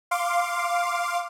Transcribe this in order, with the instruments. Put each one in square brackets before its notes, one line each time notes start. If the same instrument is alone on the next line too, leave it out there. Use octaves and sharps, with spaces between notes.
[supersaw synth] F5 C6 D6